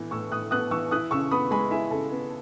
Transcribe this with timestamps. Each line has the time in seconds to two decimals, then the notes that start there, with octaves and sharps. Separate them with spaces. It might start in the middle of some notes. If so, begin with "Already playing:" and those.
Already playing: A2 E3 B3
0.11 A2 C#6 E6
0.31 A2 D#6 F#6
0.51 B3 D#6 F#6
0.71 E3 C#6 E6
0.91 E4 D#6 F#6
1.11 C#3 C#6 E6
1.31 B3 B5 D#6
1.51 G#3 G#5 B5
1.71 E4 E5 G#5
1.91 C#3 A4
2.11 B3